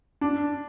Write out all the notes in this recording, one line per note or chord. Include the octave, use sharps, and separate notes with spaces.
D4